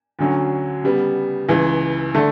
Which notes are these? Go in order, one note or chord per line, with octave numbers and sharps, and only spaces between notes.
D2 D3 F#3 C#4
C#3 G3 B3
C#2 C#3 E3
D3 A3 D4